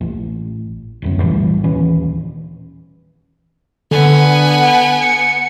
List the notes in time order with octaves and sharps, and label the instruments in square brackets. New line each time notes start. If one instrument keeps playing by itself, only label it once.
[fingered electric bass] A1
D1 A1 F#2
B1 A2 E3 G3
D#1 E3 C#4
[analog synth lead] D3 [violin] B3 G#5
[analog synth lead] C#7